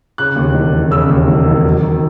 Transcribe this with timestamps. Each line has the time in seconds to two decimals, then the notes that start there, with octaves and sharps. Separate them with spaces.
0.18 C#3 F#6
0.36 D#2
0.54 E1
0.73 E1
0.91 C#3 E6
1.10 D#2
1.28 E1
1.46 E1
1.64 F#3
1.82 D#3